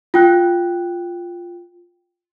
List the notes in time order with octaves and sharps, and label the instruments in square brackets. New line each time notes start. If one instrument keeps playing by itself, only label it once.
[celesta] F4 G5 F#6